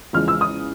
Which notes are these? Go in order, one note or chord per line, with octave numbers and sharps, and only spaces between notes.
E2 C#3 F3 G#3 F6
E6
D#6